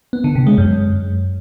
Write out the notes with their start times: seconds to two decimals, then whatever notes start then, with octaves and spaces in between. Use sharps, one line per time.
0.13 B3
0.24 D3
0.35 C3
0.47 G#3
0.58 F#2